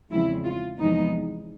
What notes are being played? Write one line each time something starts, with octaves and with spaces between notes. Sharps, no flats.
E2 C#3 F3 G#3 C4 E4
F4
E2 C3 F3 G#3 B3 D#4